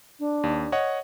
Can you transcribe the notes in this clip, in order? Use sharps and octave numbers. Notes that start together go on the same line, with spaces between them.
D4
D#2
C#5 D#5 F#5